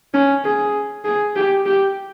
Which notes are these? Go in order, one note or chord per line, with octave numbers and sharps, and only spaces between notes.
C#4
G#4
G#4
G4
G4